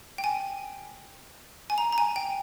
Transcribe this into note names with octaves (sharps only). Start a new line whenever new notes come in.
G5
G#5
G#5
A#5
A#5
G#5
G5